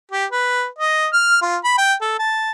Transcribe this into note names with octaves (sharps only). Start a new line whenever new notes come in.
G4
B4
D#5
F6
F4
B5
G5
A4
A5